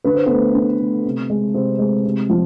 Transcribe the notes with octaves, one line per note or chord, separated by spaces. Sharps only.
D3 B4
C5
A3 B3 B4
D3
A3
C3
G#3
C3 C4 C5
G#3
C3
F3